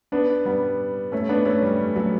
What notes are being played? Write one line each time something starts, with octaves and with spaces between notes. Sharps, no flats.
B3 D4
G3 B3
A3 C#4
B3 D4
A3 C#4
G3
G3
F#3 A3